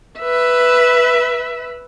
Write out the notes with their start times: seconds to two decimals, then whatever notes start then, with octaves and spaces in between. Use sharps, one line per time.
0.19 B4 E5